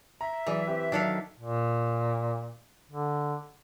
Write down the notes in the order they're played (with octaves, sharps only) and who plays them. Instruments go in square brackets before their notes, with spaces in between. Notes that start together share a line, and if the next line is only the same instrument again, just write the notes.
[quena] E5 [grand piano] A#5
[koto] E3 [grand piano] F#3 G#4 D5
[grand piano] C4 G4 B4
[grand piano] D#3 F#3 [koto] D4 A4 F5
[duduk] A#2
D3